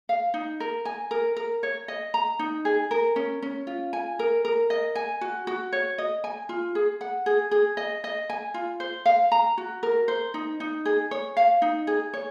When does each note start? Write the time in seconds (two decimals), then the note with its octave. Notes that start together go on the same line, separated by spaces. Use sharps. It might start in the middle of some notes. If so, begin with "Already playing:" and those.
0.09 F5
0.34 D#4
0.60 A#4
0.85 G#5
1.11 A#4
1.37 A#4
1.63 C#5
1.88 D#5
2.14 A#5
2.39 D#4
2.65 G#4
2.91 A#4
3.16 C#4
3.42 C#4
3.67 F4
3.93 G#5
4.19 A#4
4.45 A#4
4.70 D#5
4.95 G#5
5.21 F#4
5.47 F#4
5.72 C#5
5.98 D#5
6.24 G#5
6.49 F4
6.75 G#4
7.01 F#5
7.26 G#4
7.51 G#4
7.77 D#5
8.04 D#5
8.30 G#5
8.54 F4
8.80 C5
9.06 F5
9.32 A#5
9.58 F#4
9.83 A#4
10.08 C5
10.34 D#4
10.60 D#4
10.85 G#4
11.11 C#5
11.37 F5
11.62 D#4
11.87 G#4
12.13 C#5